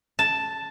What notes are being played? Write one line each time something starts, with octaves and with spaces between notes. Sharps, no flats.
A5